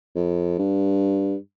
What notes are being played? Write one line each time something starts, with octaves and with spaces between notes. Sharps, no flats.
F2
G2